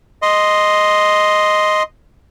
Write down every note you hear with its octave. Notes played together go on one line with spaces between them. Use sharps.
D#5 C6